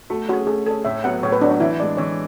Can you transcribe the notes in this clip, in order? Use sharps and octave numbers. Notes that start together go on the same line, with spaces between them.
A3 F#4
C#4 F#4 G#4
A3 G#4
C#4 G#4 A4
A2 E5
F#3 B3 F#5
A2 C#5
B4
F#3 B3 D4
D4
E3 E4
G#3 D4 D5
E3 C#5